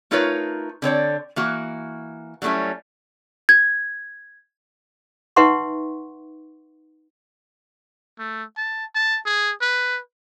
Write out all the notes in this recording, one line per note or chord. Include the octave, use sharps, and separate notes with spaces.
A3 D#4 F4 A#4 B4 C#5
D3 C4 C#5 D5
E3 A#3 F#4
F#3 G3 A3 C#4 E4
G#6
D#4 B4 E5 F#5 C6 C#6
A3
A5
A5
G#4
B4